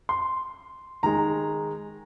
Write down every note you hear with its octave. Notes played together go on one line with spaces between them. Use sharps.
C6
D#3 G#3 D#4 A#5